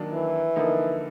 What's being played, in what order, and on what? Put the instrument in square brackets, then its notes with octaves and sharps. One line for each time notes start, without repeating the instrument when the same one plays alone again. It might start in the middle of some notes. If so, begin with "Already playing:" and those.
Already playing: [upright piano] D#3 F#3 A#3 D4
[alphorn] E3
[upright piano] D3 F3 A#3 D#4